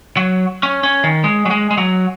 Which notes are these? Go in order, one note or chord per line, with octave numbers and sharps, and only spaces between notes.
F#3
C#4
C#4
D#3
G#3
F#3
G#3
G#3
F#3